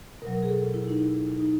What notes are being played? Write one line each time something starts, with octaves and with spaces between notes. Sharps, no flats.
B2 F#3 A#4
G#4
A4
E4
D#4
E4
D#4